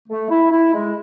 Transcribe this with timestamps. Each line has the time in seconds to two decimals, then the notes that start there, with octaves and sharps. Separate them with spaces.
0.08 A3
0.30 E4
0.51 E4
0.74 G#3